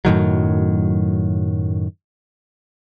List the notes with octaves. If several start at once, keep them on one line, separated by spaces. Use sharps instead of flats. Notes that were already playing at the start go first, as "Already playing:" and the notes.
F#2 A2 D#3 F#3